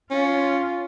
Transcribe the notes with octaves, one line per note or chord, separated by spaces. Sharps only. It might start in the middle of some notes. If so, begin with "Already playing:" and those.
C#4 F4